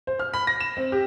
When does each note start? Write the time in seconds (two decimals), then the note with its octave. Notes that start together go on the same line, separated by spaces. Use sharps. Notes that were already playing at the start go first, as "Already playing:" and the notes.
0.07 C5
0.20 F6
0.34 B5
0.47 A#6
0.60 E7
0.77 C4
0.92 G4